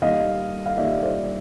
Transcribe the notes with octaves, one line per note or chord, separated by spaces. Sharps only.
D#3 G3 A#3 D#5 F5
F5
D#3 G3 A#3 D5 E5
C5 D5